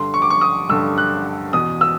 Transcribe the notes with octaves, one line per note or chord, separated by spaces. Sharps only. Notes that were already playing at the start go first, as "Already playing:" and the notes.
Already playing: G2 D3 C6
C#6
D6
C#6
D#6
G2 D3 E6
F#6
E2 B2 D#6
E6